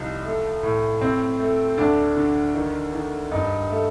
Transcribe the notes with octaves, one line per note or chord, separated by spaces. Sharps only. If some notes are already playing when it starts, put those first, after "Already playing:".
Already playing: C2 F3 D#4
A3
A2
A2 C4
A3
D2 D4
D3
D#3
D#3
G2 D#4
A3